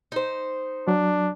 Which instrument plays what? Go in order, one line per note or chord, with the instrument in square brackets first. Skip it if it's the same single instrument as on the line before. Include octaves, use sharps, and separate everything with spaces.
[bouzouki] D#4 C5
[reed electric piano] F#3 [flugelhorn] D4